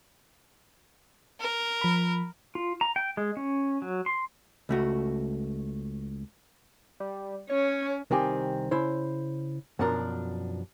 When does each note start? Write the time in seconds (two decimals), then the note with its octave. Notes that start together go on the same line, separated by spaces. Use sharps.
1.41 A#4
1.81 F3 B5
2.55 F4
2.81 A#5
2.96 G5
3.17 G#3
3.37 C#4
3.82 F#3
4.06 C6
4.69 C#2 A3 F#4
7.00 G3
7.50 C#4 C#5
8.11 C2 D#3 C4 G4 G#5
8.71 C#3 E4 C5
9.79 F#2 B2 F3 D4 A#4